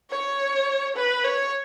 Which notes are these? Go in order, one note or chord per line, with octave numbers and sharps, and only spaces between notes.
C#5
B4
C#5